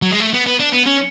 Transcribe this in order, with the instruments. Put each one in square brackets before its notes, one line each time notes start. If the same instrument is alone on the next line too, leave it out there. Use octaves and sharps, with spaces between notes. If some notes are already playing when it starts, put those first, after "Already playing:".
[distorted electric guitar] F#3
G#3
A3
B3
B3
D4
B3
C#4